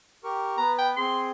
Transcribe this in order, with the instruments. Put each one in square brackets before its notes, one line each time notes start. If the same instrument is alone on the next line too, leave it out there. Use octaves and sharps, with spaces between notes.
[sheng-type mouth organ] G4 A#4 C#6
[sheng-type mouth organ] B3 B4 [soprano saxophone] A#5
[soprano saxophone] G5
[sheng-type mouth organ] C4 G#4 [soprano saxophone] C6